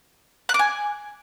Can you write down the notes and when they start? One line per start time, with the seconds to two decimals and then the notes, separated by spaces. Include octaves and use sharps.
0.49 F#6
0.54 D6
0.59 G#5